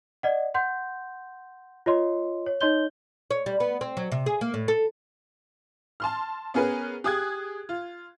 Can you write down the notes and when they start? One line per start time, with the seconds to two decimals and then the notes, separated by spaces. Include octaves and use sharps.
0.23 D5 D#5 F#5
0.54 F#5 C6 G6
1.86 F4 C#5 D#5 C6
2.46 C#5
2.61 D#4 C#5 D#5 C6 G6 G7
3.31 C#5
3.46 G3
3.60 B3
3.81 C4
3.97 F#3
4.12 C3
4.26 G#4
4.41 A#3
4.54 A2
4.68 A4
6.00 A5 C6 F6
6.54 B3 C#4 G#4 A#4 B4
7.04 G4 G#4 D#6 F#6 G#6
7.69 F4